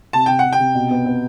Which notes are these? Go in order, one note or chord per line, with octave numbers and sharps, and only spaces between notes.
C3 A5
C3 G5
F#5
C3
G5
C3
B2
B3
B3